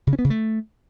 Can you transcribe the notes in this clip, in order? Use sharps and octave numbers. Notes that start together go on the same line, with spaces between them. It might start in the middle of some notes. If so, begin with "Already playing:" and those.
C#3
C#4
B3
C#3
A3